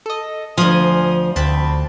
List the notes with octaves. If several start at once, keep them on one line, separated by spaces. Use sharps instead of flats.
A4 D#5
D2 F3 G#5 D#6
D2 C4 A5 B5